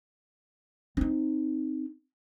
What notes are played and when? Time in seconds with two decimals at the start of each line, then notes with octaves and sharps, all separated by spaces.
0.97 C4 D#4